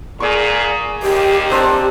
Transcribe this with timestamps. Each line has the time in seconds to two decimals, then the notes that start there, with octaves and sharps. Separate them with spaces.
0.20 A#2 G#4 D5 C#6
1.03 D#2 G4
1.51 C4 D4 G4 C5